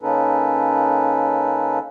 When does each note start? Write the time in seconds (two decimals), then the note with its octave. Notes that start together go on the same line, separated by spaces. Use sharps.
0.02 C#3 A#3 C#4 D#4 A4 B4